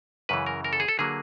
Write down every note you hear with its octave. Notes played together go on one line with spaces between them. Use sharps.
F#2 C#3 E3 B4
A#4
A#4
A4
G#4
A4
D3 F#3 A#3 G#4